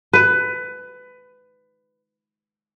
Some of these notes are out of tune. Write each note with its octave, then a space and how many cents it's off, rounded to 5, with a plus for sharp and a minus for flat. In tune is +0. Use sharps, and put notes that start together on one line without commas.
B4 +20